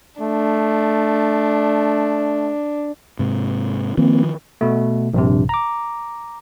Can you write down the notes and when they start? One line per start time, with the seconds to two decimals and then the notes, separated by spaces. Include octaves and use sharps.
0.21 A3 D4
3.19 G#2 C3
3.97 D#3 F3 A#3 C4
4.61 B2 A3
5.14 A#1 G2 C3
5.49 A#5 D6